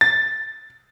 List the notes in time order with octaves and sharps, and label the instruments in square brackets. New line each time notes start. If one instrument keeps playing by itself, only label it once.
[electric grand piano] A6